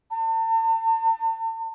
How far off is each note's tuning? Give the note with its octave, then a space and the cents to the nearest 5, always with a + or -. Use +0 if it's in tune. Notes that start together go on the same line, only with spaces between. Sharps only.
A5 +40